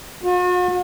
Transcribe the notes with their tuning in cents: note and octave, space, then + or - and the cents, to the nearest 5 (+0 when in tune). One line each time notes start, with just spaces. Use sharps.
F#4 -45